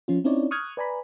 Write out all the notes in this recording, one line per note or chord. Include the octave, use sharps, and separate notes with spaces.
F3 C#4 F4
C4 C#4 D#4 E4 C#5 D5
C#6 D#6 F6 F#6 G#6
B4 D5 G#5 A#5 B5